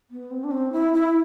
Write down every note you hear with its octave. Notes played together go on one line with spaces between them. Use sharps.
B3
C4
D4
C4
E4
E4